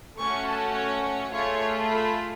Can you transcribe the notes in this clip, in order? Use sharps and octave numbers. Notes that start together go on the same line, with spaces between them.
A3 C#4 F#4 C#6
A5
C#5
C#5
A3 F4 G#4 C#5
B5